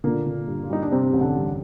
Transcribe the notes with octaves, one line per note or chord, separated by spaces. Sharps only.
A#2 D3 A#3
D3
G2
F4
G3 D#4
D4
G2 C3 C4
A1
D3 D4
G3